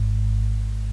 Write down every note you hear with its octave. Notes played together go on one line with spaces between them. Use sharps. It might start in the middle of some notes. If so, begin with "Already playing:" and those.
Already playing: G#1 G#2